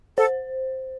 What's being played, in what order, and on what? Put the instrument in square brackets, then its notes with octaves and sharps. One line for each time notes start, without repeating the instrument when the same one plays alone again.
[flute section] A4 [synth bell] C5